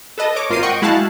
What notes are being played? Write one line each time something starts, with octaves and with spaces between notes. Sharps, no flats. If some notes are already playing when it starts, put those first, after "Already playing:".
A4 B4 D#5 A5
C#5 D6
G#1 F4 A#4 C5 C7 D#7
D#5 F#5 G5 C#6
G#3 E4 F#4 F5 A5 F#6